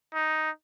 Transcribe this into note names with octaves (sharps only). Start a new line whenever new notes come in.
D#4